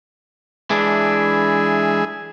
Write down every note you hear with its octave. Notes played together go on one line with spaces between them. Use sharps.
E3 G#3 D4 G#4 E5